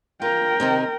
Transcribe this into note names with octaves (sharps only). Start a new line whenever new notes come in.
F4 A#4 G5
C3 D#3 C4